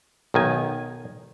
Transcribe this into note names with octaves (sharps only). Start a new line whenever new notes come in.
B1 D#3 G#5